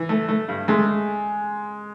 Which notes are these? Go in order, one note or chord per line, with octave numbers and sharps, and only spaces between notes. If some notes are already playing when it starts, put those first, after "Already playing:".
Already playing: E3
A3
A3
G2
G#3 A3